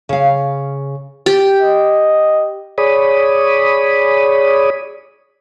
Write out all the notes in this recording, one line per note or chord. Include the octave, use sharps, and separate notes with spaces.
C#3 F5
G4
D#5
G#4 C#5 D5 B5 D#6